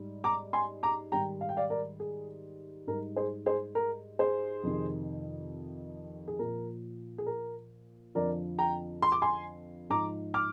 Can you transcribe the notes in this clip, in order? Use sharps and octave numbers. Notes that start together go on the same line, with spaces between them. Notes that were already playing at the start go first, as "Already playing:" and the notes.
Already playing: G#2 G3
A#5 D6
G#5 C6
A#5 D6
G#2 D#3 G3 G5 A#5
F5
G5
D5 F5
A#4 D5
G#4
G#2 G3 A#4
G#4 C5
G#4 C5
A#4
G#4 C5
F2 C3 D#3
G#4
A#2 F3 A#4
G#4
A#4
F2 D3 F3 A#4 D5
G5 A#5
C6
D6
G#5 C6
G#2 F3 A#5 D6
D6 F6